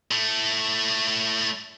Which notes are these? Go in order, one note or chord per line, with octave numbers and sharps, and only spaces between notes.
A2 A3